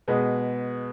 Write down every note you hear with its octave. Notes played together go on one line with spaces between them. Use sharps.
B2 G#3 B3